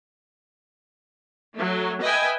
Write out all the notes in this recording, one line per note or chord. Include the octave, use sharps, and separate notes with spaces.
F#3 A3
B4 D#5 E5 G5 G#5